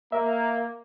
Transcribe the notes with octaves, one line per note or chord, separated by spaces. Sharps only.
A#3 E5